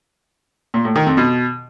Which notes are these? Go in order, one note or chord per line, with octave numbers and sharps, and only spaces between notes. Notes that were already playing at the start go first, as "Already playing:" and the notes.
A#2
A2
D#3
F2
B2